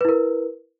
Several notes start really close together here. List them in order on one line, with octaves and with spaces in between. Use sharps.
B4 E4 A#4